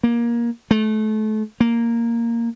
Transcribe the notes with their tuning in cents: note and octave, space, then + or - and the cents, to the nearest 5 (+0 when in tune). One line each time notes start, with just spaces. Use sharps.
A#3 +20
A3 -30
A#3 -5